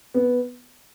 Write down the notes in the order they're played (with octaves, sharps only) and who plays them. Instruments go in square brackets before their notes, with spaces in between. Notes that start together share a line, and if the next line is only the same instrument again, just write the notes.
[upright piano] B3